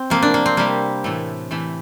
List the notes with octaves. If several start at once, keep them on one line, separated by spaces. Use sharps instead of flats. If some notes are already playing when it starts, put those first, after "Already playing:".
Already playing: C4
C3 F3 A3 A#3
D4
A#3
C4
C3 G3 A#3
A2 E3 A3
C3 E3 A3